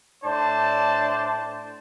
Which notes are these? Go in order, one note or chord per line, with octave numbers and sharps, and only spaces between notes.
A2 D4 C5 D5 A5